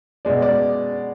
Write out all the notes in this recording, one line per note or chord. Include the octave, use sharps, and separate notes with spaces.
B2 G#3 D5
D5